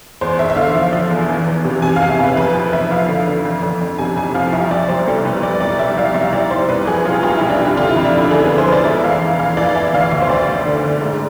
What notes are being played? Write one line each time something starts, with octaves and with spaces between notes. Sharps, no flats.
E2 C5
E2 E5
E5
D3 F5
F3
F3
E2
E3
E2
C3
C3 G#5
E2 F5
E5
E3 B4
F2 B4
F3
F3 E5
F3 F5
D3
D3
F2
F2
F2
C3 G#5
F2 G#5
F3 F5
C2 E5
F3 D5
C2 C5
C2 A4
C2 B4
C2 D5
C2 D5
C2 E5
C2 F5
C2 E5
C2 D5
C2 C5
C2 B4
F3 G#4
C2 F4
C2 F4
C2 E4
D4
C3
E4
D3 F4
E4
F2
D4
D3 E4
D3 G#4
D3 B4
C5
F3 D5
G#2 E5
E3 F5
E3
E3 F5
E3 D5
E3 E5
D2 F5
D2 E5
C5
D2 D5
D2
D3
D3
G#2